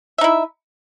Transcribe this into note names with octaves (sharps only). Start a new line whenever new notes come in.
D#4 E4 E5